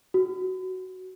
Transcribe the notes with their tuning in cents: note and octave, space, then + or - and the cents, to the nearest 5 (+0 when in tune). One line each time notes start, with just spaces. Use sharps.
F#4 +10